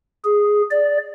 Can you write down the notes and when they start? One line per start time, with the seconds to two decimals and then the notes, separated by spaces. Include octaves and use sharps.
0.24 G#4
0.70 D5